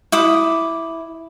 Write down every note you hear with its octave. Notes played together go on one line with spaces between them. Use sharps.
E4 D6 D#6